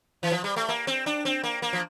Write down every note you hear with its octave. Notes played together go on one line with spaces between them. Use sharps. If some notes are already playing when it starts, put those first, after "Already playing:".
E3
F3
G3
A3
A#3
C4
D4
C4
A#3
A#3
F3